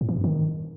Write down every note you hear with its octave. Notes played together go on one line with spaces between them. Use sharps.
A2
E3
F#2
D#3